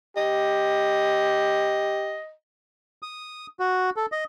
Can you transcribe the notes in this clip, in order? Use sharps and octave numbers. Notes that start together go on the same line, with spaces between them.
G4 D#5
D#6
F#4
A4
D#5